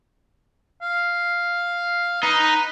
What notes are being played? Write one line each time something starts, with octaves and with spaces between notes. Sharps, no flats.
F5
D#4 B4